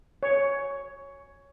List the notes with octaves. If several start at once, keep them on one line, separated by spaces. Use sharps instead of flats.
C#5